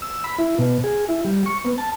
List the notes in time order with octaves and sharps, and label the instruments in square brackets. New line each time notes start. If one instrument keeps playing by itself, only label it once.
[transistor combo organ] E6
B5
E4
B2
G#4
E4
G3
C#6
B3
A5